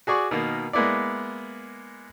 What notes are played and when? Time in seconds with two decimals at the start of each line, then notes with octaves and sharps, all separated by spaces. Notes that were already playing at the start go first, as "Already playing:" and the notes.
0.07 F#4 G#4 D5 C#6
0.31 B2 D#3 A#3
0.73 G#3 A#3 B3 E4 D5